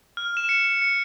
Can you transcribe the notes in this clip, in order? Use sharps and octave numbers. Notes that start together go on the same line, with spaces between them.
F6
E7
C#7
C#7
C#7